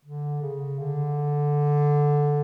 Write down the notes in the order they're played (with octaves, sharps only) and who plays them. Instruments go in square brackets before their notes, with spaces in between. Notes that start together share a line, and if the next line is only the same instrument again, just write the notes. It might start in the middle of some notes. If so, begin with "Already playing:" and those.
[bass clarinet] D3
C#3
D3